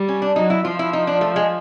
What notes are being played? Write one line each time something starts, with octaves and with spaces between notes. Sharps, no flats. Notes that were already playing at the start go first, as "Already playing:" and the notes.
Already playing: G3
C#4
D4
F#3 D#4
E4
F3 F4
E4
D#4
D4
A3
G#3